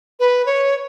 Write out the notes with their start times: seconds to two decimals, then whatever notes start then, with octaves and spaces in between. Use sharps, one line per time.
0.20 B4
0.46 C#5